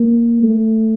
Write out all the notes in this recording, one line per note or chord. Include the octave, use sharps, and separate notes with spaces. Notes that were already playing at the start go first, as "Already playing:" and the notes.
Already playing: A#3
A3